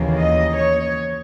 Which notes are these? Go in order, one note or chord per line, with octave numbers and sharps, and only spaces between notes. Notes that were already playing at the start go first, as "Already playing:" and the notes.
Already playing: D#2 C#3 E3 A#3
D#5
C#5